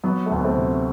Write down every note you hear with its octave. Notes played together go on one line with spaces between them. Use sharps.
F#3 B3
A3
D2 B3
A3 C4
C3